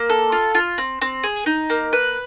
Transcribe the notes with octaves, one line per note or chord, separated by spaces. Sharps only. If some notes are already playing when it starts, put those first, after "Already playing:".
Already playing: A#3
A4
F4
F4
C4
C4
G#4
D#4
A#3
B4